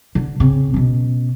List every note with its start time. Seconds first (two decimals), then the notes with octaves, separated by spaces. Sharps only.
0.15 D3
0.40 C#3 C4
0.74 B2 C#4